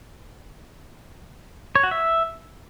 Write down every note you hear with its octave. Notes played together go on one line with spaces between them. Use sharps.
C#5
F#4
E5